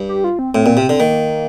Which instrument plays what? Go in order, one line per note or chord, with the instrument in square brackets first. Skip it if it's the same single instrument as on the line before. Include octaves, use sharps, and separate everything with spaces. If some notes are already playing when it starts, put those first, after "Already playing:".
Already playing: [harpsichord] G2
[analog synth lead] G4
F4
C4
[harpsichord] A2 [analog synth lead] C4
[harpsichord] A#2
[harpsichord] C3 [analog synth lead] C4
[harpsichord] D3
[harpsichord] D#3 [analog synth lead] A#3